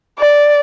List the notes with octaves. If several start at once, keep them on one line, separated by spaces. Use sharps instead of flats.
D5